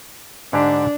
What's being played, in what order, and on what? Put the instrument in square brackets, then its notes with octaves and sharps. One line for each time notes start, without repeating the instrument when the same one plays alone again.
[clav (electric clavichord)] G#2 D3 G4 [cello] D4